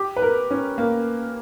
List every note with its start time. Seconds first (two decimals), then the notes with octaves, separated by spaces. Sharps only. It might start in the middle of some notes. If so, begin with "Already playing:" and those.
Already playing: G4
0.16 B4
0.22 A#4
0.51 C#4
0.78 A#3